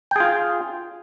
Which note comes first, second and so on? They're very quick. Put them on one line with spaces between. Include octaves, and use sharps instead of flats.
G5 G#4 F4